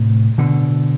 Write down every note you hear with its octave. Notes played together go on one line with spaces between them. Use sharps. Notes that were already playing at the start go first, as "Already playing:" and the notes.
Already playing: A2 C3
B2 D3